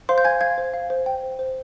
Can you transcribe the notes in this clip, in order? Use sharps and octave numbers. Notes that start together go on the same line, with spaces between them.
C5 F5 C6
G6
F5 G#5 G#6
F5 G#5 G#6
C5
F5
C5
G5
C5
C5